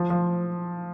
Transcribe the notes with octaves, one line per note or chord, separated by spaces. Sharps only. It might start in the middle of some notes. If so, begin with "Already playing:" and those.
Already playing: F3
F3